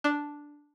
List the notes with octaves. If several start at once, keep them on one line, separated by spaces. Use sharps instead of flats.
D4